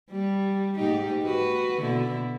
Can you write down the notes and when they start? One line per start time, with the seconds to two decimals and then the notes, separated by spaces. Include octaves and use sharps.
0.11 G3
0.76 G#2 D#4 G4
1.23 F#4 B4
1.80 B2 D3 E4